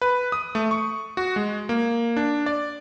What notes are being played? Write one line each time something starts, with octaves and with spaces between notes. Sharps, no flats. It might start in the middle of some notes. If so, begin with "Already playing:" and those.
B4
D#6
A3
C#6
F#4
G#3
A#3
D4
D5